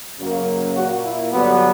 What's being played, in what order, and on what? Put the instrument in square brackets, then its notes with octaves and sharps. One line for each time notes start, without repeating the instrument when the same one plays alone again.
[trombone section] F#2 C#3 F#3 A#3
A#2 A#3 F#4
E4
G2 D3 F#3 B3